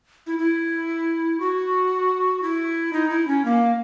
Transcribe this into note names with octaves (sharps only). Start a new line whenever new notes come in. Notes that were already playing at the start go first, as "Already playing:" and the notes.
E4
E4
F#4
E4
D#4
E4
C#4
A#3